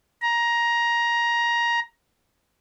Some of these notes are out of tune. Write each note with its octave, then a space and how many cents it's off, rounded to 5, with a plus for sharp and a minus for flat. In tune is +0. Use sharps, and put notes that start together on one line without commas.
A#5 +15